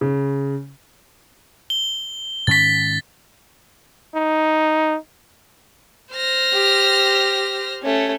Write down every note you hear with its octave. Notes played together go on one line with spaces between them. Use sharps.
C#3
G7
G#2 D#3 C#4 A6 B6
D#4
C5 F6 A#6
G4
A3 C#4